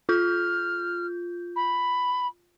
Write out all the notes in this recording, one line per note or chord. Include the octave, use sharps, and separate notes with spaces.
F4 F6 G6
B5